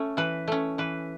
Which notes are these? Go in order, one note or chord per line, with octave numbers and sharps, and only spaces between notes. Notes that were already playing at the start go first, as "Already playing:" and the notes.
Already playing: A3 C#4
E3 B4
A3 C#4
E3 B4